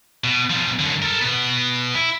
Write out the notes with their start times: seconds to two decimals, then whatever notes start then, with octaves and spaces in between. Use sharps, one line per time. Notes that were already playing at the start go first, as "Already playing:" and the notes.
0.24 B2
0.50 B2 F3
0.79 F#2 D3
1.02 A4 A#4
1.21 B2 B3
1.95 E4